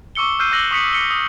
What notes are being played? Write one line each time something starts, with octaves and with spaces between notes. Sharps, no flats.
C#6 D6 E6 C#7 G7
E6 F6 G6 C7 D#7
D6 E6 F#6 A#6 F#7 G7
C#6 D#6 B6 C#7 F#7
E6 C#7 G7
D#6